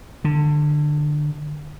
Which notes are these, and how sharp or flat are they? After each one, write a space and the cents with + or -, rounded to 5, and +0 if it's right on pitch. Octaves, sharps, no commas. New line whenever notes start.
D3 +20